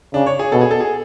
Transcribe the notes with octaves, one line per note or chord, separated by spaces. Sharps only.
C#3 D4
C#5
G#4
B2 A4
G#4
A4
G#4